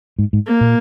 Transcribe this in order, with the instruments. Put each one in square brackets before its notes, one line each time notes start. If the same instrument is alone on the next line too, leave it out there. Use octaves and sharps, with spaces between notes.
[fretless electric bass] G#2
G#2
[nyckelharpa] A#3
[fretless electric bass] A#2